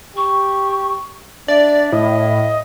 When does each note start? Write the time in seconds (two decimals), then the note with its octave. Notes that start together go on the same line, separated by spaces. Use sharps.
0.16 G4 C#6
1.48 D4 D5 E5
1.92 A2 D#5